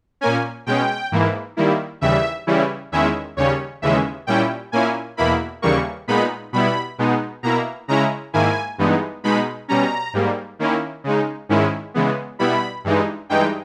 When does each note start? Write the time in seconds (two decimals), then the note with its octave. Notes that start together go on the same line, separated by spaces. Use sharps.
0.21 A#2 A#3 C#4 G#5
0.66 B2 G#3 C#4 G5
1.12 G#2 E3 A#3 E4
1.57 D#3 G3 A#3 E4
2.01 D#2 C#3 E3 G3 E5
2.47 C#3 E3 G3 C#4 E4
2.92 E2 D#3 G#3 C#4 E4 E5
3.36 D#2 C#3 G3 C#4 C#5
3.82 D#2 C#3 E3 G#3 C#4 E5
4.27 A#2 G3 C#4 E4 G5
4.72 A#2 A#3 C#4 E4 G#5
5.17 E2 B2 A#3 E4 B5
5.62 D#2 C#3 E3 G3 A#3 C#6
6.08 A#2 G#3 B3 D#4 B5
6.52 B2 G3 B3 E4 B5
6.98 B2 G#3 B3 D#4
7.43 B2 A#3 E4 A#5
7.88 C#3 G#3 C#4 E4 A#5
8.33 G#2 D#3 A#3 E4 G#5
8.78 G2 E3 G#3 B3 D#4
9.24 B2 G#3 D#4 B5
9.68 B2 G3 C#4 A#5
10.13 G#2 G3 A#3
10.59 D#3 A#3 C#4 E4
11.04 C#3 G#3 D#4
11.49 G#2 D#3 G#3 C#4 E4
11.94 C#3 E3 G#3 B3
12.39 B2 G3 B3 E4 B5
12.84 G2 E3 G#3 D#4
13.29 G2 E3 G#3 D#4 G5